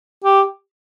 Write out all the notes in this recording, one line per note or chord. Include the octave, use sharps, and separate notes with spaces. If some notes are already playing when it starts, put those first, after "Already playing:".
G4